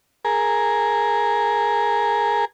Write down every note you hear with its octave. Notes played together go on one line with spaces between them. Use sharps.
G#4 A#4